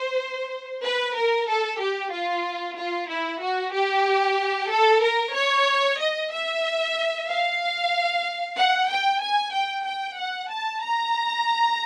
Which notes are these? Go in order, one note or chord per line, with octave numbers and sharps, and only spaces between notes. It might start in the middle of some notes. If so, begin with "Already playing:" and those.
Already playing: C5
B4
A#4
A4
G4
F4
F4
E4
F#4
G4
A4
A#4
C#5
D#5
E5
F5
F#5
G5
G#5
G5
G5
F#5
A5
A#5